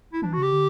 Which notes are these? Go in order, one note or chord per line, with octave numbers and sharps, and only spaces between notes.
E4
E3 D4
F#4
C#3 G4
D3